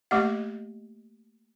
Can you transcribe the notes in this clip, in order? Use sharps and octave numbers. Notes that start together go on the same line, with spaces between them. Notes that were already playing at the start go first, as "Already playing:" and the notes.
A3 A#3 G4 D#5 F#5